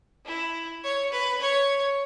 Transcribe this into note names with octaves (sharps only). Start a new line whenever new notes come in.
E4
C#5
B4
C#5